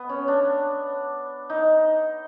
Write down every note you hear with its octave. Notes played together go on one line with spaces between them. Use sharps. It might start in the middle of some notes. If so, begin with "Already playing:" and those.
Already playing: B3
C#4
D4
D#4